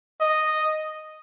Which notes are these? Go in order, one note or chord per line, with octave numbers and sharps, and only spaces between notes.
D#5